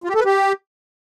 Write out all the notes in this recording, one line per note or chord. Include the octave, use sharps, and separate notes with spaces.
F4
G4
A4
B4
G4